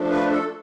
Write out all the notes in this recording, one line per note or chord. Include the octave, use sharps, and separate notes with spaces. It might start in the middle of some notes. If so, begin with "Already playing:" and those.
Already playing: F3 A3 D4
B4
A4